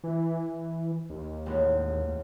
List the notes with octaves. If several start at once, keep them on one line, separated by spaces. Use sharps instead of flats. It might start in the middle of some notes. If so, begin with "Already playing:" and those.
E3
D#2
E1 A1 F#6